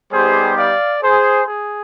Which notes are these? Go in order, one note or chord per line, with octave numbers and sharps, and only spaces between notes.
G3 B3 D#4 G4 G#4 C5
D5 F5
G#4 C5
G#4